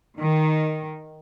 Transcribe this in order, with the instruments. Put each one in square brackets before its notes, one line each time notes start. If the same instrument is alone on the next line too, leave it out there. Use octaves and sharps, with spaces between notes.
[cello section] D#3